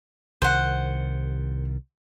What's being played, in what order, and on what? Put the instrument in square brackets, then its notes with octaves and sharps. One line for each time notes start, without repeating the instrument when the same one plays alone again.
[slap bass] C2 D#3 [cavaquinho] C5 F#5